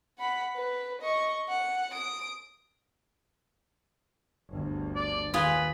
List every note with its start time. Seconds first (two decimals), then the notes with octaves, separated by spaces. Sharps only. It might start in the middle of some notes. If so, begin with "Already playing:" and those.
0.19 F#5 B5
0.56 B4
1.01 D#5 C#6
1.49 F#5
1.92 D#6 D7
4.49 G1 D2
4.95 D5
5.34 D#2 F4 G#4 B4